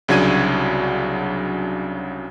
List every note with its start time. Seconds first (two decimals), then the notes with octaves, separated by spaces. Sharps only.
0.08 C2 C#3 F#3 D4 G#6 D#7